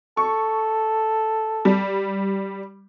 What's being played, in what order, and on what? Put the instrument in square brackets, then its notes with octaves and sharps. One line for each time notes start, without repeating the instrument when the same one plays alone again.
[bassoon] A4 [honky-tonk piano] C#6
[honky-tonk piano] G3